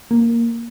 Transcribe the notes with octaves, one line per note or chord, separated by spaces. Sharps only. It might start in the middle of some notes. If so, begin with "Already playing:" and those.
A#3